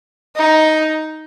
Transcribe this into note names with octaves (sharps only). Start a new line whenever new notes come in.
D#4